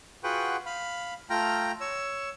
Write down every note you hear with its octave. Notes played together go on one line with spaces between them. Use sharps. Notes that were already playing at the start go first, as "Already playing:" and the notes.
F4 F#4 G#4 B4 F#5 G5
F5 B5
A3 F4 G5 A#5 F6
C#5 E6